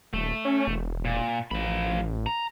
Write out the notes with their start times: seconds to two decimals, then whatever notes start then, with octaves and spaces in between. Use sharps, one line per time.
0.13 D#1 A3
0.45 C#4
0.67 E1
1.05 A#2
1.51 A1 F3 B5
2.26 A#5